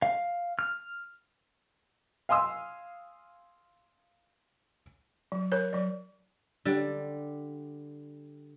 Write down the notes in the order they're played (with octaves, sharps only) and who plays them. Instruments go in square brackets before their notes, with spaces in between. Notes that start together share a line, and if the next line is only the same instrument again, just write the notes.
[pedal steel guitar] F5
F6
[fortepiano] F5 G#5 C6 D#6 E6
[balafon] F#3
A#4 C#5
F#3 D5
[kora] D3 G3